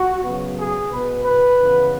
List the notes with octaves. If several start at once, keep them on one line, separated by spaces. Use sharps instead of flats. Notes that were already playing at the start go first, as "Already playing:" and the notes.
Already playing: F#4
C#3 F#3 B3
G#4
B2 B3 B4
B4
C#3 E3 B3